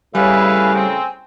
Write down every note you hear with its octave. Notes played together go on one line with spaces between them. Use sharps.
A2 C#3 G3 E4 B4 F5 G#5
C4